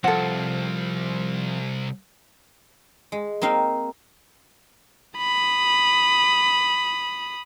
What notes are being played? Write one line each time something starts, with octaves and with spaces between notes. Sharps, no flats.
C2 F3 C4 A4 F#5
G#3
A#3 C4 D#4 F5
B5 D#6